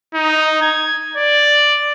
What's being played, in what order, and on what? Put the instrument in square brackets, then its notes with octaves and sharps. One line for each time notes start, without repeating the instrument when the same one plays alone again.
[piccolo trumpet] D#4
G#6
D5